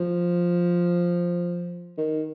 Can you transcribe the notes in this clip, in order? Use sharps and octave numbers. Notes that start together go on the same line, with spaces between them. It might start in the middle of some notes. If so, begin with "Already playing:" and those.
Already playing: F3
D#3